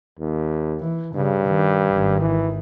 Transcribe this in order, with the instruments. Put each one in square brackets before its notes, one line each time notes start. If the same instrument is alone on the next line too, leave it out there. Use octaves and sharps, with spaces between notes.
[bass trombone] D#2
[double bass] E3
[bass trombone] G2 [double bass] C#3
[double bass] D#3
G#1 D#3
[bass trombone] E3